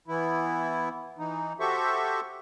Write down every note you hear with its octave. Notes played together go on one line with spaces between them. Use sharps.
E3 B3 E4
E3 D#4
F#4 G4 A4 C5 E5 C#6